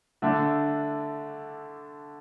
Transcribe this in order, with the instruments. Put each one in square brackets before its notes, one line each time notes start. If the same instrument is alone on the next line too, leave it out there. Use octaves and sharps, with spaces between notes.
[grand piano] D3 A3 D4